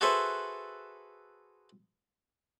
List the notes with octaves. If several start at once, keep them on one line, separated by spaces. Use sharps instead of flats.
F#4 G#4 A4 B4 C5 E5